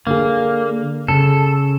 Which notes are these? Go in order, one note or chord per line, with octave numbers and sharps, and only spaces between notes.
D3 A#3 G#4
C#3 A4